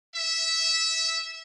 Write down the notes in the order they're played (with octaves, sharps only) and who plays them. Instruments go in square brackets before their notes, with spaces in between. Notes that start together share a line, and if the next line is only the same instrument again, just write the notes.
[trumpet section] E5